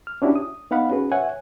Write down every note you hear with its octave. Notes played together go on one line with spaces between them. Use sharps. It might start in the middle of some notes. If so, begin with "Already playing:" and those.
F6
C#4 D4 E4 F#4 G4
D#6
B3 D#4 F5 F#5 B5
C#4 F#4 G#4 B4
C#5 E5 F#5 G#5